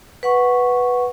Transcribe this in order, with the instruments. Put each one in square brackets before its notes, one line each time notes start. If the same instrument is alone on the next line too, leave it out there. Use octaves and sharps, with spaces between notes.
[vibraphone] B4 F#5 C#6